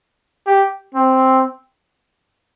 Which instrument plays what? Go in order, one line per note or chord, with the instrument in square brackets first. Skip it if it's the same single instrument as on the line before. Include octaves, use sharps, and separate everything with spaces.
[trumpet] G4
C4